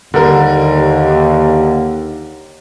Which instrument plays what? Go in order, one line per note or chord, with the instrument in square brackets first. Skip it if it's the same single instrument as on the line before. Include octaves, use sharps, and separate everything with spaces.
[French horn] D#2 [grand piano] D3 G3 A#4